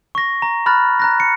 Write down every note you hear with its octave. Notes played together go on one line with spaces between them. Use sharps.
C#6 A#6
A#5
B5 F6 F#6 A6
A#5 F#6 A#6
C#7